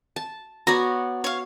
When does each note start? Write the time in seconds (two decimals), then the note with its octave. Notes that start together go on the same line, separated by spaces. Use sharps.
0.16 A5
0.67 B3 F#4 C#5 D5 A#5
1.24 C#5 F5